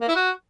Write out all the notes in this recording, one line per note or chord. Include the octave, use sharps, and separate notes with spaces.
A#3
E4
F#4